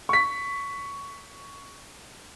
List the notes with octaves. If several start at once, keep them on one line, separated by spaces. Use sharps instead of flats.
C#6 B6